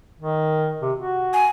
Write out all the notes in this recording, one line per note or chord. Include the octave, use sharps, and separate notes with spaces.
D#3
C3
F#4
G#5